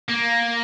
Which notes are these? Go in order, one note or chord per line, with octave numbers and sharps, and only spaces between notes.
A#3